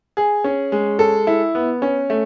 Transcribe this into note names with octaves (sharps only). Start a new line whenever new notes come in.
G#4
C#4
G#3
A4
E4
B3
C#4
A3